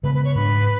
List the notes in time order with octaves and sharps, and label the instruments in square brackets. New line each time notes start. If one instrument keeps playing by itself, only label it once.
[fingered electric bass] C#3 G#3 B3 [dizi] B4
[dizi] B4
C#5
[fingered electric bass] G#2 G#3 D4 [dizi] B4